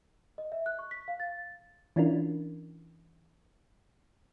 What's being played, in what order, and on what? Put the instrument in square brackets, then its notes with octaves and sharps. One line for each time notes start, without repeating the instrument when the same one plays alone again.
[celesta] D#5
E5
F#6
C#6
B6
F5
A6
[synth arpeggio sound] E3 C#4 D4 E4 F4 A#4